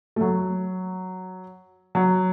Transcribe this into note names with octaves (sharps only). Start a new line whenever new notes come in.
A3
F#3
F#3